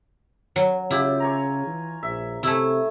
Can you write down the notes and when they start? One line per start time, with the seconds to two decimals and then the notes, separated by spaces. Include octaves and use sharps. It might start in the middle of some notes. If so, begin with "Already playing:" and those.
0.56 F#3
0.91 C#3 E4 F4 G4
1.20 C#5 G#5 A#5
1.67 E3
2.03 A#1 E5
2.43 C3 A3 E4 G#5 D#6 E6